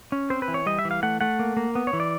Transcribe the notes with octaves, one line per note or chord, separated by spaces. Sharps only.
C#4
C4 C5
B4
E3
C#5
G3 D#5
E5
E3
F5
A3 F#5
A3 F#5
A#3
A#3
B3
C#5
E3
D5